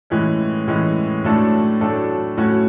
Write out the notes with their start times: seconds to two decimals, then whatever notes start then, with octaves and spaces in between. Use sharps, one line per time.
0.10 A2 E3 G#3 C#4
0.68 A2 E3 G#3 C#4
1.24 A2 F#3 A3 D4 A4
1.81 A2 F#3 A3 D4 A4
2.37 A2 F#3 A3 C#4 F#4